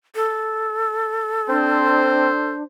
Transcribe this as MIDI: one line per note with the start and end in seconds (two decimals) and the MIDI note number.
0.15 2.52 69
1.49 2.29 60
1.49 2.63 62
1.49 2.64 72